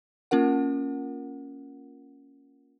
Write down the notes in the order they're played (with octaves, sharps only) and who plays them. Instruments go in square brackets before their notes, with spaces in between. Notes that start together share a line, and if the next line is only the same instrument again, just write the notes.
[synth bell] A#3 C#4 F4 A#4 F#5